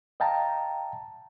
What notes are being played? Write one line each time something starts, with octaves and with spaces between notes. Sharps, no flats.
D#5 F5 G5 A5 A#5